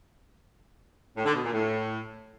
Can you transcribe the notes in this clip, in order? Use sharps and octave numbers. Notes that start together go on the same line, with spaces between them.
A2
D3
B2
A#2
A2